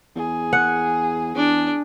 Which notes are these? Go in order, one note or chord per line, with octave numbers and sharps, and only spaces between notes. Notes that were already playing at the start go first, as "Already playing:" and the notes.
E2 G#4
F#5
E2 D4